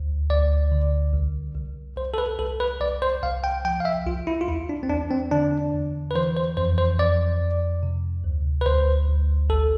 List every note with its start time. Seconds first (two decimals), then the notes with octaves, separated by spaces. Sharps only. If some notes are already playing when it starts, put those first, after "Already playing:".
Already playing: D2
0.30 D2 D5
0.71 D3
1.13 C2
1.55 C2
1.97 C2 C5
2.14 A4
2.18 B4
2.39 C2 A4
2.60 B4
2.81 C2 D5
3.02 C5
3.23 C2 F5
3.44 G5
3.65 F3 G5
3.80 F5
3.85 E5
4.06 C2 F4
4.27 E4
4.41 F4
4.48 E2 E4
4.69 D4
4.83 C4
4.90 E2 D4
5.11 C4
5.31 D3 D4
5.74 E2
6.11 B4
6.15 E3 C5
6.37 C5
6.57 F2 C5
6.78 C5
6.99 F2 D5
7.41 F2
7.83 C3
8.24 D2
8.61 B4
8.66 D2 C5
9.08 D2
9.50 A1 A4